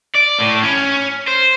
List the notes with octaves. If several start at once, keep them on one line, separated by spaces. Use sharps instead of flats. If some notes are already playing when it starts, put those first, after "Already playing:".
D5
A2
C#4
C5